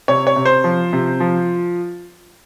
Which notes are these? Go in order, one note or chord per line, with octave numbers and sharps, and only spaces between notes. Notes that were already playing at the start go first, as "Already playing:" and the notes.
C3 C#5
C#5
C3
C5
F3
C3
F3